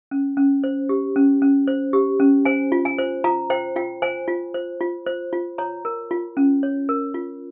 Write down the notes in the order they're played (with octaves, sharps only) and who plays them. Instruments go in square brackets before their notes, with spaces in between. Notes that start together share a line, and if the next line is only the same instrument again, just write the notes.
[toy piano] C#4
C#4
C5
G4
C#4
C#4
C5
G4
C#4
C5 G#5
F4
G#5
C5
F4 A#5
C5 G5
F4 G5
C5 G#5
F4
C5
F4
C5
F4
C#5 A#5
A#4
F4
C#4
C#5
A#4
F4